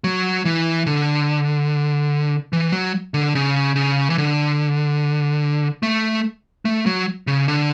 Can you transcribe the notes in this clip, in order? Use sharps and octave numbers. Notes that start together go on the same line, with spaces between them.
F#3
E3
D3
E3
F#3
D3
C#3
C#3
E3
D3
A3
A3
F#3
C#3
D3